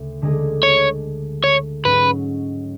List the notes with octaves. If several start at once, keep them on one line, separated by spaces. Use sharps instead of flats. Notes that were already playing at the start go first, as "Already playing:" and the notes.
Already playing: D2 C#3
D3 G#3 D4 G#4
C#5
C#5
G#2 F#3 C#4 B4